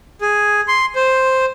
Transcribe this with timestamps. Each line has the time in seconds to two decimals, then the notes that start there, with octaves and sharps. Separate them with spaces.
0.21 G#4
0.68 C6
0.95 C5